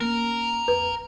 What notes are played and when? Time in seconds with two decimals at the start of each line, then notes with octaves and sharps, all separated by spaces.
0.01 A#3 C#4 A#4
0.68 F2 B4